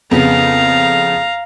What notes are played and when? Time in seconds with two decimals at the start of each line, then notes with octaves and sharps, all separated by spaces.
0.11 F2 C#3 B3 F5 A#5